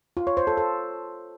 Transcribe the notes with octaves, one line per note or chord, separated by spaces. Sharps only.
F4
C#5
C5
A4
A4